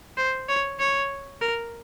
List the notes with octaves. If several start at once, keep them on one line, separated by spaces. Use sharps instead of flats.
C5
C#5
C#5
A#4